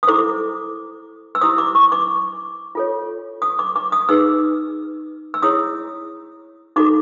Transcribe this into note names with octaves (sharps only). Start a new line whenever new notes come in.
D#6
E4 A4 C5 D6
E6
E4 G4 C5 D#6
D6
C#6
D6
F4 A4 C#5
D#6
D6
D6
D#6
D#4 G#4 B4 E6
E6
E4 G#4 C#5 D#6
D#4 F#4 A4 D6